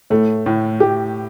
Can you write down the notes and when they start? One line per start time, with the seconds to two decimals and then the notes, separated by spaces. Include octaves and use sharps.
0.10 A2 A3
0.46 A2
0.80 A2 G4